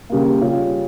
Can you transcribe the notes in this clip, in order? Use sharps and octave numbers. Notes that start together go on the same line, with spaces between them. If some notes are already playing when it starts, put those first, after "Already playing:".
C#3 G3 A#3
C#3 G3 C#4 F4